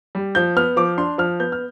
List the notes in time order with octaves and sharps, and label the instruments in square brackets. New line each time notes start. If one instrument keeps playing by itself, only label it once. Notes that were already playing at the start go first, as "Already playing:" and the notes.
[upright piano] G3
F3 G6
B3 F6
F3 D6
D4 C6
F3 F6
B3 G6
F6